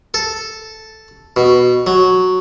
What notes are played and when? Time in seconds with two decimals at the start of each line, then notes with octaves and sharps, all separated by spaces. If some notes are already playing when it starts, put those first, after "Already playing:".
0.14 A4
1.36 B2
1.87 F#3